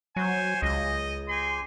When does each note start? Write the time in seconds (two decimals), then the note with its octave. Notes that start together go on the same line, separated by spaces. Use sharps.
0.16 F#3 C5 C#5 G#5
0.62 C#2 D#5
1.29 G4 G#5 C6